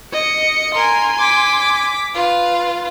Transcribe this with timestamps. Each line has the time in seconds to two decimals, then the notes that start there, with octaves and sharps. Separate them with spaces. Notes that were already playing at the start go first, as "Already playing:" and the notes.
0.13 D#5 C#7
0.74 A#4 G#5 C6
1.19 D6 B6
2.14 F4 B4